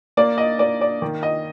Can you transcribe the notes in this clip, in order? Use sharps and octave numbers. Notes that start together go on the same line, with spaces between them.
A#3 D5
D#5
A#3 D5
D5
D#3
D#5